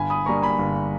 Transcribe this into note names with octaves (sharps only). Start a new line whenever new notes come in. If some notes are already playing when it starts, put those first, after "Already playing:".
Already playing: G1 G#5 B5
B5 D#6
G2 G3 A#3 A#5 C#6
G#5 B5
G1